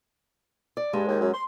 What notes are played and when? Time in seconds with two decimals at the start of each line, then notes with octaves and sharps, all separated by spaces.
0.77 D5
0.93 G2 G#3
1.07 D#2
1.21 F#2
1.33 C6